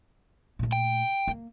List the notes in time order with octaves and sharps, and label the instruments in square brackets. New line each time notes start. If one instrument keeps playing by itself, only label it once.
[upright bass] A#2 A3
[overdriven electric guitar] G5
[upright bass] A#3